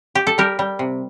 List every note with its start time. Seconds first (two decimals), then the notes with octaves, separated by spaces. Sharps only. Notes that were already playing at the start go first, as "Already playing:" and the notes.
0.15 G4
0.27 A4
0.38 G3 G4 A#4
0.59 G3
0.79 C3